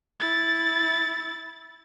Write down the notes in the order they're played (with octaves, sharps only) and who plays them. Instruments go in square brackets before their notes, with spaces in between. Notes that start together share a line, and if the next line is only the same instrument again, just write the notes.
[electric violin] E4 A6